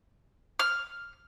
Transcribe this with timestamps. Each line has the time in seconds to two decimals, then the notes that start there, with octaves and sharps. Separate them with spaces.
0.59 F6